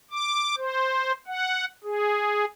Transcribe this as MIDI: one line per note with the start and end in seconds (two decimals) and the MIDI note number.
0.11 0.55 86
0.57 1.12 72
1.27 1.65 78
1.84 2.45 68